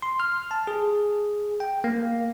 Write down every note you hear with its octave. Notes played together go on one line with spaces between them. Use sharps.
C6
F6
A5
G#4
G5
A#3